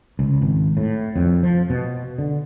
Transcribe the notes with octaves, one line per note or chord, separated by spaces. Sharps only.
C#2
G#1
A2
F2
F3
B2
D3